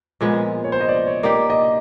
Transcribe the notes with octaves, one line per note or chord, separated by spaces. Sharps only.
A#2 F3 G#3 B3
C#5
C5
D#5
D5
C#5
A#3 D#4 G4 D5
D#5